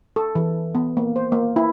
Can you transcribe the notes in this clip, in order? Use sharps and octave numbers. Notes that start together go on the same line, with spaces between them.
A4
E3
B3
A#3
C5
A#3
E4